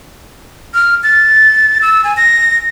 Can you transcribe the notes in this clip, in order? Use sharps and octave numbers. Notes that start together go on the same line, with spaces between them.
F6
A6
E6
G#5
A#6